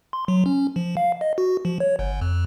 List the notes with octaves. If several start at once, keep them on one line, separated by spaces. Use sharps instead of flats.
C6
F#3
C#4
F3
F5
D#5
F#4
F3
C#5
G1
F2